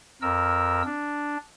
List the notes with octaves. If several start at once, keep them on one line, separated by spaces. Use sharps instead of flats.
F2 A#4 E6
D4